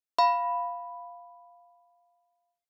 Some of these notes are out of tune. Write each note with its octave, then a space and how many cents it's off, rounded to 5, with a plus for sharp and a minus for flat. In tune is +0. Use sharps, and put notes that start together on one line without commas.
F5 +0 B5 +0